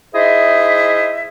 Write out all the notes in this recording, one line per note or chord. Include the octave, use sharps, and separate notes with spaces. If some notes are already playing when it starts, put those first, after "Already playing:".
D#4 E4 G#4 C5 D#5 E5